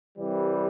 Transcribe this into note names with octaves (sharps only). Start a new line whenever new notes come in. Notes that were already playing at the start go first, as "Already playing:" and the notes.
C2 C3 E3 G3